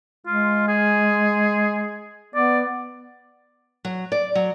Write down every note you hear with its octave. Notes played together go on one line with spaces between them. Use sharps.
G#3 F4
G#4
B3 D5
F#3
D5
F#3